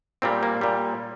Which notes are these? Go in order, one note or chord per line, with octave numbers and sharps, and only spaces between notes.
A#2 G3 C4
A#3
A#2 G3